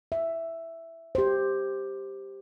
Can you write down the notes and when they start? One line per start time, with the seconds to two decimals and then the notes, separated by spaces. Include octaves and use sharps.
0.12 E5
1.15 G4 C5